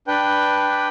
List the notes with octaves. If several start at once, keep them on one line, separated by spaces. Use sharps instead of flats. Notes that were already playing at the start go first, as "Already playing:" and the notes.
D4 B4 G5